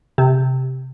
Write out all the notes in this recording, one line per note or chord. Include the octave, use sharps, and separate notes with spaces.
C3